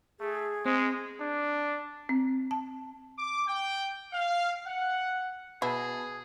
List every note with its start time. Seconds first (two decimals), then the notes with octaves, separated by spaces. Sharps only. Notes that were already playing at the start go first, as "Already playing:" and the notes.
0.20 A3 G#4
0.65 G#3 C4
1.20 D4
2.09 C4
2.51 A5
3.18 D6
3.48 G5
4.13 F5
4.67 F#5
5.62 B2 E4 G#4 B4 A5